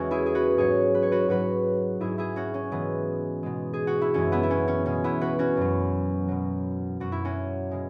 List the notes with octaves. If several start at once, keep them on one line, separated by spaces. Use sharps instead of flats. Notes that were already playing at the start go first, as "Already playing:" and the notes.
Already playing: E2 E3 G#3 C#4 F#4
E4 G#4
G#4
F#4 B4
G#2 F#3 G#4 C#5
B4
C#5
F#4 B4
G#2 F#3 F#4 B4
G#2 F#3 E4 G#4
E4 G#4
C#4 F#4
C#4
G#2 E3 G#3 B3
B2 G#3
G#4
F#4
E4
F#2 E3 G#3 C#4
B3 E4
E4
C#4
C#4
B2 G#3 C#4
B3 E4
F#4 B4
C#4 F#4
F#2 F#3
B2 F#3
F#2 F#3 F#4
E4
C#4 F#4
B2 G#3